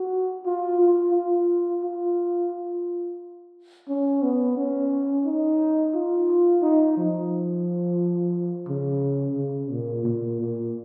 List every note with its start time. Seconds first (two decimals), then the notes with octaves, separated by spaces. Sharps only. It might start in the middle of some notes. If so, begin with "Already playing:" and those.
Already playing: F#4
0.46 F4
0.80 F4
1.14 F4
1.83 F4
2.51 F4
3.89 C#4
4.23 B3
4.57 C#4
5.25 D#4
5.95 F4
6.62 D#4
6.97 F3
8.69 C#3
9.37 C#3
9.71 A#2
10.05 A#2
10.40 A#2